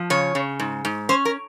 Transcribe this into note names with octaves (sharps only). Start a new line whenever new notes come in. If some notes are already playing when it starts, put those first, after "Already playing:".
Already playing: F3
C#3 C#5
C#3
G#2
G#2
C#4 C5
A#4